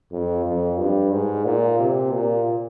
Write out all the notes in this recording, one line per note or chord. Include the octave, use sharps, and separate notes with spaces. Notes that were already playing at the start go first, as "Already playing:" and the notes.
F2
F2
G2
G#2
A#2
C3
A#2